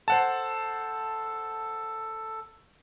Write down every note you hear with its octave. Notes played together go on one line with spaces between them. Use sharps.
A4 C5 F#5 A5